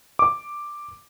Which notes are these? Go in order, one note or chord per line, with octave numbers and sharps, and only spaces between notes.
D6